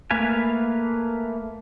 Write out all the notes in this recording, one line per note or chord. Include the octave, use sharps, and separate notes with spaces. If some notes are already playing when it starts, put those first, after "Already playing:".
A3 A#3 B4 F5 G#5